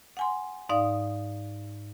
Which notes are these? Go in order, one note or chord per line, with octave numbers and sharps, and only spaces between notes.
F#5 G#5 C6
G#2 D#4 D5 F5 D#6